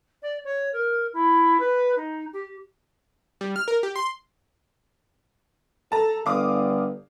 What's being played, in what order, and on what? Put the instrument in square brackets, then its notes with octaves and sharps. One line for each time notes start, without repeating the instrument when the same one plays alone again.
[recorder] D5
C#5
A#4
E4
B4
D#4
G4
[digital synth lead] G3
F6
A#4
G4
C6
[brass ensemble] A4 [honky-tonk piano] A5 A#5
[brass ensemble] G1 D3 [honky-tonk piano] F5 D6 D#6